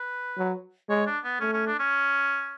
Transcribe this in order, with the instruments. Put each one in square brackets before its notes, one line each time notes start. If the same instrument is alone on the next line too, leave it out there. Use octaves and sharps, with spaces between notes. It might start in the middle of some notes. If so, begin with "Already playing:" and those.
Already playing: [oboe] B4
[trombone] F#3
[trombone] G#3 [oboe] C#5
[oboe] D4
B3
[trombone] A3 [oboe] C#4
[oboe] C#4
D4
C#4